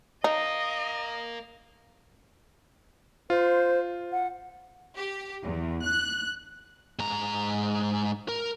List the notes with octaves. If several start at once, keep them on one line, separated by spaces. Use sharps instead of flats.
D#4 A#4 D#5 F5
F4 C5
F#5
G4
E2
F#6
G#2 A#5
A#4